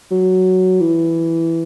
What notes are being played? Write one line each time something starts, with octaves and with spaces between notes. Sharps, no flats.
F#3
E3